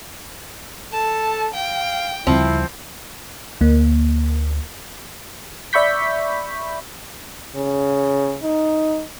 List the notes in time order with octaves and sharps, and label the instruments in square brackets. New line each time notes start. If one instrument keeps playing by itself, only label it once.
[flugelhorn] A4 [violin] A5
[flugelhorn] F5 [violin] G5
[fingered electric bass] D2 C#3 G3 [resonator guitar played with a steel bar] F3 C4 [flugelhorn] E4
[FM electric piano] D2 A#3
D5 E5 B5 C#6 G6 B6
[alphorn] C#3
D#4